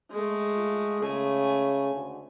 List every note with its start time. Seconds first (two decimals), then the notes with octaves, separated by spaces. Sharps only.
0.11 G#3 A3
0.55 F4
1.01 C#3 A3 G#5
1.94 D2